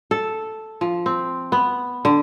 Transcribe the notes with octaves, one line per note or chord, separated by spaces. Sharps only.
A4
F3
C4
B3
D3